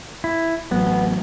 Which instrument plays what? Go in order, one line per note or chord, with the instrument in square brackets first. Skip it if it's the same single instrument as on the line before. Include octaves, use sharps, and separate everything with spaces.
[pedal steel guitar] E4
[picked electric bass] A1 F#3 [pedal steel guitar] B3